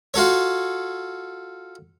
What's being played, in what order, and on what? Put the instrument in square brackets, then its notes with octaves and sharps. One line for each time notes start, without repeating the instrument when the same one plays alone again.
[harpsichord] F4 F#4 A4 C#5